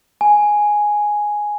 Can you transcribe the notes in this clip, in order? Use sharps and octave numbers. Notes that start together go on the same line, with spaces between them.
G#5